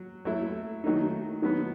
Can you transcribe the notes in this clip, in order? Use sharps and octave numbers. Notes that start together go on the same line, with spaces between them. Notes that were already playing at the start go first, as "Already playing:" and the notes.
Already playing: F#3
F#3 A3 E4
D#3 F#3 A3 D#4
D#3 F#3 B3